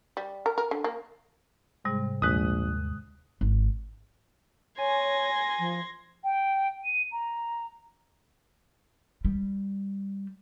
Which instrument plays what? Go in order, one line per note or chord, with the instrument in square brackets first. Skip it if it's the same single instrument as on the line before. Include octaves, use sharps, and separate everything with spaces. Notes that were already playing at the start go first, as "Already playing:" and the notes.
[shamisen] G3
A#4
A#4
D3
A#3
[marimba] G#2 C3 G3 [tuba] G#3
[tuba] A#1 [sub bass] D#2 [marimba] D3 G#3 [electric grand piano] D#6 F#6
[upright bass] G#1
[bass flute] C#5 [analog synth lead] G#5 [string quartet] C6 G#6 A#6
[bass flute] F3
[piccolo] G5
D#7
A#5
[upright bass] G3